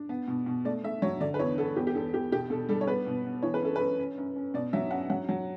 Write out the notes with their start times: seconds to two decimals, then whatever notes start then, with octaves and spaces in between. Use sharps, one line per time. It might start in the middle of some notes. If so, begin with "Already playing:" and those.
Already playing: D4
0.09 B3
0.28 B2
0.46 B2
0.65 A3 D5
0.84 A3 E5
1.02 F#3 C#5
1.20 D3 D5
1.34 B4
1.39 E2 C#5
1.58 B3 A4
1.76 E2 G4
1.87 G4
1.95 E2 A4
2.13 E2 G4
2.32 B2 G4
2.50 B2 A4
2.69 G3 A4
2.81 C#5
2.87 B3 B4
3.07 B2
3.25 B3
3.42 E3 C#5
3.54 B4
3.62 F#2 A4
3.76 F#2 B4
3.99 C#4
4.18 F#2
4.36 C#4
4.54 B2 D5
4.73 F#3 E5
4.91 C#4 F#5
5.10 F#3 F#5
5.29 F#3